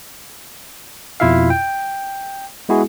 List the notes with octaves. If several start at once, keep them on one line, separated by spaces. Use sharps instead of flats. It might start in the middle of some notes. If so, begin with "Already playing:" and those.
F2 B2 E4 F4 E5 F5
G5
G#3 B3 E4 F#4 G#4